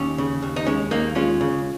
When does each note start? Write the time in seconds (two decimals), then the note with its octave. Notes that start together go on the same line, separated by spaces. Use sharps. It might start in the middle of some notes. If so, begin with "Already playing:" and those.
Already playing: D#2 C#4
0.18 C#3
0.42 D#2
0.56 D#4
0.67 G#3 C#4
0.91 D#2 A#3 D#4
1.15 G#3 C#4 F4
1.41 C#3